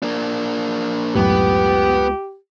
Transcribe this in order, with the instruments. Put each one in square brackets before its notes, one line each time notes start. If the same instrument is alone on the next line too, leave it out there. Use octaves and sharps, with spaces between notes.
[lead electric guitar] A#3 D4
[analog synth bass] C#2 [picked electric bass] F#2 A2 [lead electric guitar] B3 [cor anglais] G4